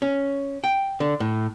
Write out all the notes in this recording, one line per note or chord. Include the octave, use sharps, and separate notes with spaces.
C#4
G5
D3
A2